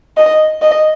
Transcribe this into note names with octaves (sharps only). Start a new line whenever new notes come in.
D#5
D#5